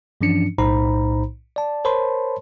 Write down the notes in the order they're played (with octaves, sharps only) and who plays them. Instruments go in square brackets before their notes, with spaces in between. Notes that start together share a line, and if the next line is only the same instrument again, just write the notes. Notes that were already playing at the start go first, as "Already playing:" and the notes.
[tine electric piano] G2 E3 F3 C#4 D4 C#7
B1 A2 D#4 C5 A#5 B5
D5 A5
A#4 C5 C#5 A5 B5 C6